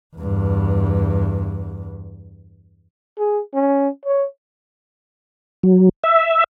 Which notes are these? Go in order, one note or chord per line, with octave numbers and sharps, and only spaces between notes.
E2 G2
G#4
C#4
C#5
F#3
E5